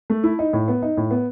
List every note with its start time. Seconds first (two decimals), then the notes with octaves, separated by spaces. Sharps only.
0.10 A3
0.24 E4
0.39 D#4
0.53 A2
0.68 B3
0.82 D#4
0.97 A2
1.11 B3